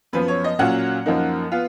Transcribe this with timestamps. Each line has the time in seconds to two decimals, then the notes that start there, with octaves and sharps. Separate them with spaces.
0.13 F#2 F3 B3 B4
0.28 C#5
0.44 D#5
0.59 A#2 F#3 C#4 F4 F#5
1.06 F#2 F3 A#3 D#4
1.52 B3 F4